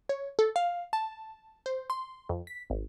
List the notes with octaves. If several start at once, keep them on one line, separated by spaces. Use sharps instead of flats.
C#5
A4
F5
A5
C5
C6
F2
B6
G#1